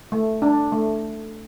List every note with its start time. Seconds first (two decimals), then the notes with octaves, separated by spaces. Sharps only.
0.12 A3
0.42 D4
0.72 A3